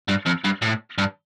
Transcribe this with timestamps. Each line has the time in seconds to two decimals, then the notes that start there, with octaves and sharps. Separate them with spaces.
0.09 G2
0.26 F2
0.45 G2
0.62 A2
0.98 G2